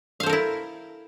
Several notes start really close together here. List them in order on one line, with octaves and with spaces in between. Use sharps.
F5 C5 A4 A#4 E4